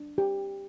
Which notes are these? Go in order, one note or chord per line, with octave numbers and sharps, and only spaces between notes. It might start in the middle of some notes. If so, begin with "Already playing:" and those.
Already playing: D4
G4